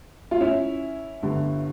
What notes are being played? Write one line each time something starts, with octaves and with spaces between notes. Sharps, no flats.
F4
C#4 E4
G1 G2 D3